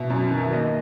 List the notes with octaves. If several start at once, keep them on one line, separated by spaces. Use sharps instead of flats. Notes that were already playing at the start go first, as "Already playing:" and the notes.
Already playing: B2 E5
F#2
D#3
E5
A#3 D#5